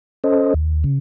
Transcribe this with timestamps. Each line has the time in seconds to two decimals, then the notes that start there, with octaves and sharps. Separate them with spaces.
0.24 C#4 A4 C5 D#5
0.54 D#2
0.84 C#3